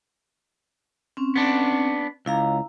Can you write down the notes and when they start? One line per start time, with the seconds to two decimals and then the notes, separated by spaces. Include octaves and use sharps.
1.17 C4 C#4
1.36 B3 D4
2.26 C#2 E4 F5 A#5